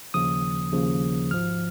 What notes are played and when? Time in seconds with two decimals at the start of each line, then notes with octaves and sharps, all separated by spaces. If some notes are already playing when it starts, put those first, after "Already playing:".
0.14 D#2 C#3 F3 D#6
0.72 D#2 C#3 F3
1.30 G#1 G#2 F3 F6